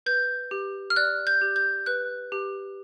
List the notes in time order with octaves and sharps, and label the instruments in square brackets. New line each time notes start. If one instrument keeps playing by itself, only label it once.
[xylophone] B4 G6
G4
F6
D5 F#6
G6
G4
G6
B4 F#6
G4